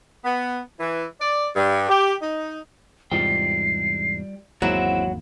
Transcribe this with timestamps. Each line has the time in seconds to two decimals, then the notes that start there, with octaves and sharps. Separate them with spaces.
0.24 B3
0.80 E3
1.21 D5
1.56 G2
1.89 G4
2.22 D#4
3.11 E2 G#2 C3 G3 F4 G5 C7
4.62 G#1 E2 F#3 G#3 A#3 C4 E4 F#5